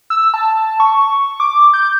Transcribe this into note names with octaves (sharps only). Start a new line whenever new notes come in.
E6
A5
C#6
D6
G6